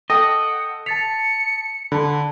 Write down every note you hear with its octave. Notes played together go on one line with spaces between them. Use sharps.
A4 D#5 F#5 G5
A5 A6 B6 C#7 F7
D3 A5 B5